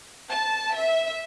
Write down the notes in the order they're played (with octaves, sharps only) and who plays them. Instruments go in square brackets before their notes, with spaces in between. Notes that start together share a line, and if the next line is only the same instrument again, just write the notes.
[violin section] A5
E5